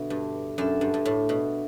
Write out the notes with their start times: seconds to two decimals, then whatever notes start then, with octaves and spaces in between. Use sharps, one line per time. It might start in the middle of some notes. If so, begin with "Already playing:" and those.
Already playing: B2 D3 D4 A4 E5
0.10 G2
0.58 F#2 D4 A4 E5
0.81 G2
0.94 G2
1.05 A2
1.29 B2